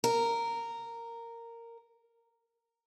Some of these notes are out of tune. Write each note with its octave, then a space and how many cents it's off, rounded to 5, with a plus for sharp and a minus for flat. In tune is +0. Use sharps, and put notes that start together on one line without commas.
A#4 -10